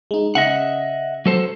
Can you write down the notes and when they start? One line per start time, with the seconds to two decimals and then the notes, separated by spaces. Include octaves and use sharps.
0.11 G#3 D#4
0.35 C#3 D#5 E5 F#5
1.26 F#3 A4 C5